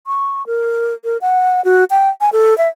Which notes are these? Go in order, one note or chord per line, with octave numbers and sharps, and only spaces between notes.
C#6
A#4
A#4
F#5
F#4
G5
G#5
A4
E5